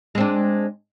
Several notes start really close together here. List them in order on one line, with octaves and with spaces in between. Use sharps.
G#3 C4 D4